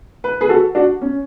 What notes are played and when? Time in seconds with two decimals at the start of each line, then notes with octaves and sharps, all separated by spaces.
0.24 B4
0.41 G#4 B4
0.49 F#4 A4
0.75 D4 F#4
1.01 C#4